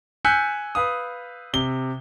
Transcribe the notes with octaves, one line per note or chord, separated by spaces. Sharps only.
G#5 E6 F#6 G6 B6 C#7
B4 F5 D#6
C3 G7